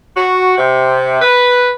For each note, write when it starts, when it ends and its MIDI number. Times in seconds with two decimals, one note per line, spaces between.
0.16 0.57 66
0.57 1.19 48
1.22 1.69 71